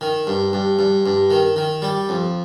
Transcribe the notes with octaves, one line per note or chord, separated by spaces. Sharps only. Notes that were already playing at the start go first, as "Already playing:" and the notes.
D#3
G2
G2
G2
G2
D#3
D#3
G3
F2